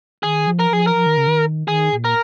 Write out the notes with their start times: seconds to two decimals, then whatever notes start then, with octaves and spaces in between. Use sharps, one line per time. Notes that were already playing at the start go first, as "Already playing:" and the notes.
0.22 D#3 G#4
0.47 F3
0.59 A#4
0.71 F3 G#4
0.87 A#4
0.95 F3
1.06 D#3
1.17 C#3
1.27 D#3
1.67 D#3 G#4
1.93 A#2
2.05 A#4